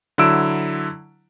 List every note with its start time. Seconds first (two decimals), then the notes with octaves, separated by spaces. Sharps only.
0.18 D3 F#3 E4 E6 D7